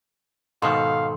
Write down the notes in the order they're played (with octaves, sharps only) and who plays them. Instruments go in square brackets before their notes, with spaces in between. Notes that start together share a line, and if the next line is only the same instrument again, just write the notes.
[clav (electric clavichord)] G#2 B2 D#3 [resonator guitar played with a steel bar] A4 [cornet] F5 [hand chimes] C6